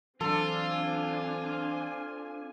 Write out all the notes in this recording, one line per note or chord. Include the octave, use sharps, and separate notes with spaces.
E3 F#3 C4 D4 F4 A4 G#5